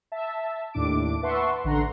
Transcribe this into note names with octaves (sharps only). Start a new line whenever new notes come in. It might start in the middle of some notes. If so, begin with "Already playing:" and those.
E5 A5
D#2 A2 D4 D6 D7
B4 E5 F#5 A5 C6 C#6
A1 D3 F#5 A#5 C6